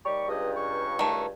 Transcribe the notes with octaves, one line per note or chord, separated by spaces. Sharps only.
D#2 G3 C#6
C#2 G2 D#5
C#6
D#3 A3